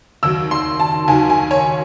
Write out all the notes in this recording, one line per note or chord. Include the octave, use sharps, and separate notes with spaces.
D#2 D#3 F#3 E6
C6
A5
D#2 D#3 F#3 G#5
G#5
C#5